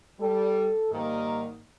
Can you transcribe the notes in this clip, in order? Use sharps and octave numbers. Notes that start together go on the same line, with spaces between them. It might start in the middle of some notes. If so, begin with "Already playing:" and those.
G3 A4
G#2 D#3 G3 A#3